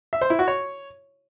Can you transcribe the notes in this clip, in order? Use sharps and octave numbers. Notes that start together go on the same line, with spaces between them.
E5
C5
E4
F#4
C#5